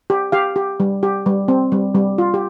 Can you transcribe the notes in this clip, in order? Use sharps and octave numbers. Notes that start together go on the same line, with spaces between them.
G4
G4 F5
G4
G3
G4
G3
C4
G3
G3
F4
G4